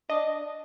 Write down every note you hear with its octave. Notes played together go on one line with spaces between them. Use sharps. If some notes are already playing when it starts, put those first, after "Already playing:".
D4 D#5